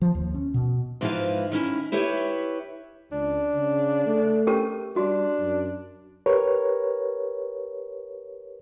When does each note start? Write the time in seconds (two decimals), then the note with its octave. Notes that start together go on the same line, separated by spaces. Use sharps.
0.02 F3
0.15 D#2
0.34 C#4
0.54 B2
1.01 G#2 E3 F3 E4 B4 F5
1.52 D#3 C#4 E4
1.92 E4 G4 B4 C#5 E5
3.12 C#2 D4
3.54 C#3
4.06 A3
4.47 C#4 G4 A#4
4.96 G3 D4 F#4
5.40 F#2
6.26 G4 A#4 B4 C#5